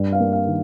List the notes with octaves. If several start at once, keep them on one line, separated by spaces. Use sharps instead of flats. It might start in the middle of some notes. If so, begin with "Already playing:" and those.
Already playing: G2
F5
A#3
F5
D#3